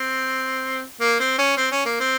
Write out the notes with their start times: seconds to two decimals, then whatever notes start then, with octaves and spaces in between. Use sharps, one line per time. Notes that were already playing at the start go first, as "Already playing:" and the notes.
Already playing: C4
1.00 A#3
1.20 C4
1.38 C#4
1.57 C4
1.71 C#4
1.85 A#3
2.00 C4